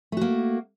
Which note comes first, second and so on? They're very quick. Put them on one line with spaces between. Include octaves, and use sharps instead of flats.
A3 F#4 A#3